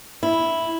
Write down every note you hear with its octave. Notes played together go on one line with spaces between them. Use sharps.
E4